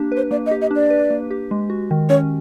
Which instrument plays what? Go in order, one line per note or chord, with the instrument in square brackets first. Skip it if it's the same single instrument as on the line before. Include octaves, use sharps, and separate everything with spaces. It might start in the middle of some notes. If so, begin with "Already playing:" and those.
Already playing: [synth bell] A#3 D4 G4
B4
[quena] C5
[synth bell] A#3 [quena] D5
[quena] D#5
[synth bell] G4
[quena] D#5
[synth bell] D4 [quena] D5
[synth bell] B4
A#3
G4
G#3
F#4
D#3
[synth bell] C#4 [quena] C#5